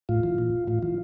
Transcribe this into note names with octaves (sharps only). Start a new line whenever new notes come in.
A2 F4
E3
A#2
A2 F4
E3 F4